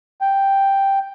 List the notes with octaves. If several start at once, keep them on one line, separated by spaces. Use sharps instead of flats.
G5